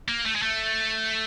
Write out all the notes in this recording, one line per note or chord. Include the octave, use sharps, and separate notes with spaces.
A#3
A3
G#3
A3